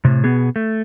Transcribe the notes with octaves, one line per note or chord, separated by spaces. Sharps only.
A2 C3
B2 B3 G#4
A3